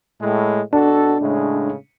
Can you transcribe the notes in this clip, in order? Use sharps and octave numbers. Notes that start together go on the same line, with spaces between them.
A2 G#3
B2 D4 F#4 A4
A2 C#3 G#3